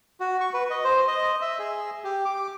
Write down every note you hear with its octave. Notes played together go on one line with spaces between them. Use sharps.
F#4
C#6
B4
D#5
C5
D#5
E5
G#4
G4
D6